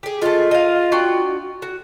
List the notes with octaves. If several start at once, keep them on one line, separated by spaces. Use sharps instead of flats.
G4 G#4
G#3 A3 F4
D#5 F5
D4 F#4 G5
F#4